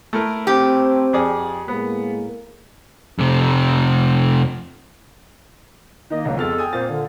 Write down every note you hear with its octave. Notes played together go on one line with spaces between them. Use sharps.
A3 E4 A#4
C4 G4 C5
F2 G#4 D5
A2 G#3 A#3 B3
F2 C3
D#3 A#3 D#5
C#2 G#2 D3 F#3 A#3
F2 G#3 B3 A4 F6 A6
G5 G#5 D#6
A#2 A#3 C4 C5 A6
D3